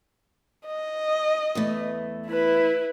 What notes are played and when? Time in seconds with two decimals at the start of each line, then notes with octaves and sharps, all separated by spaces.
0.66 D#5
1.55 E2 E3 A3
2.27 E4 B4